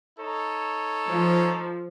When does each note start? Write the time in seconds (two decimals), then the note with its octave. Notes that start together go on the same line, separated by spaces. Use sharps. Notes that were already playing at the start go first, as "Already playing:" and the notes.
0.19 D#4 A4 C#5
1.08 F3